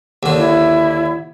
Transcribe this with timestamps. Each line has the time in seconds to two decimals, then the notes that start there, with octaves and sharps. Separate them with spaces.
0.23 D#2 D3
0.37 E4